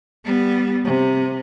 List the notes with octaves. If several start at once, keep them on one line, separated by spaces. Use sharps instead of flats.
G3 B3
C3